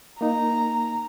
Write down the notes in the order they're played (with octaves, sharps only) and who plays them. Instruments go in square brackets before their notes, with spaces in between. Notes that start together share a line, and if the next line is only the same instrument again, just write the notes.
[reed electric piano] A#3 D#4 [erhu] A#5